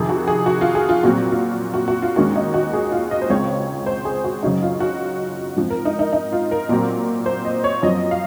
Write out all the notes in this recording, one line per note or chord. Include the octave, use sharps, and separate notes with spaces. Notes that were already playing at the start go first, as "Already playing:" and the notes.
Already playing: F2 C3 D#3 G#4
F#4
G#4
F#4
F4
G#4
F4
A#2 F#3 C4 F#4
F4
F#4
F#4
F4
D#2 D#3 G#3 C#4 F#4
D#4
F#4
G#4
F4
D#5
C5
C#2 C#3 G#3 C4 C#5
C5
G#4
F#4
F#2 C#3 F#3 C#4 D#4
F4
F#4
G#2 F3 C4
A#4
D#4
D#4
D#4
F4
A#4
A#2 F#3 C4
C5
D#5
C#5
F#2 F3 C4 D#5
F5